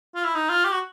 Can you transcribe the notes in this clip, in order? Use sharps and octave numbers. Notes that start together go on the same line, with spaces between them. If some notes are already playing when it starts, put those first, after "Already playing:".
F4
E4
D#4
F4
G4
F#4